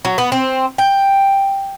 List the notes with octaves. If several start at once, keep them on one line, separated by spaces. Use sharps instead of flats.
F#3
B3
C4
G5